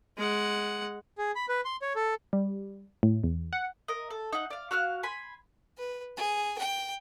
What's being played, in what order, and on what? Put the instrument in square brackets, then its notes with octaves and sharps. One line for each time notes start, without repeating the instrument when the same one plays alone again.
[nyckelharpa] G#3 F#5
[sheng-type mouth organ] G#4
B5
B4
C6
C#5
A4
[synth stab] G3
A2
E2
F#5
[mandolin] A#4 D#5
A4
D#4 F#5
D5 F5
F#4 F5 F6 F#6
G#5 B5 C6
[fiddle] B4
G#4
G5